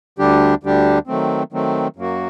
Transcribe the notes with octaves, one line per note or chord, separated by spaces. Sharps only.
D2 D3 G3 D4 G4
D2 D3 G3 D4 G4
D#3 F#3 A3 C4
D#3 F#3 A3 C4
F#2 F#3 A#3 F#4